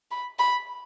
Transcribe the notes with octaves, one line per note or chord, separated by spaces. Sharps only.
B5
B5